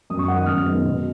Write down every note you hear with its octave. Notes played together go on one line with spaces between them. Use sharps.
F#2 D#6
C#6
D#3 G#3 F#5
D#6
F#2 F6
D#3 G#3 B3 D#4
B2